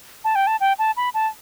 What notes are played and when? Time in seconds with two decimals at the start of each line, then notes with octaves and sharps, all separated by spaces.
0.25 A5
0.35 G5
0.47 A5
0.60 G5
0.79 A5
0.97 B5
1.14 A5